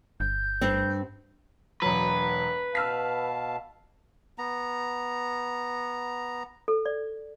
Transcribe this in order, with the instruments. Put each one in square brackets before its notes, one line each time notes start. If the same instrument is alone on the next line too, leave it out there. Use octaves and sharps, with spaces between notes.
[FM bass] G1 [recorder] G6
[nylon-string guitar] G2 C4
[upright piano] E1 F#3 [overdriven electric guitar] B4
[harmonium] B2 F5 A5 [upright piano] E6 F6 B6
[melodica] B3 A#5
[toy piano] A4
D5